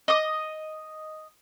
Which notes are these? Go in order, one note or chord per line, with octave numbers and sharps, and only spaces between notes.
D#5 D#6